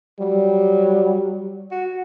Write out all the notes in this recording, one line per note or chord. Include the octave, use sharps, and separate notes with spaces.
F#3 G3
F#4